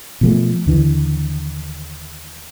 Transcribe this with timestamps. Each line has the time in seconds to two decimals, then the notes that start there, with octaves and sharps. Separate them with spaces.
0.21 B2 F3 A3
0.66 D#2 D3 E3